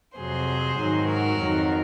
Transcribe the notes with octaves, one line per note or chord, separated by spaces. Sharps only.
F2 C3 F#3 G#4 C5
G#2 D#3 F#3
F#4 A#4
F2 D#3 F#3